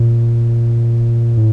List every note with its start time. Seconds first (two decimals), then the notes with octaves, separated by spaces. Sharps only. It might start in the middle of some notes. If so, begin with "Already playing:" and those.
Already playing: A#2
1.37 A2